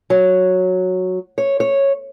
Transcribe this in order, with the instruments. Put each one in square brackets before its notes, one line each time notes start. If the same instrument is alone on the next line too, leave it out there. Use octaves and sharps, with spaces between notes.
[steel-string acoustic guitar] F#3
C#5
C#5